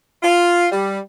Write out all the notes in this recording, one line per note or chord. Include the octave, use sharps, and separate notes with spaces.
F4
G3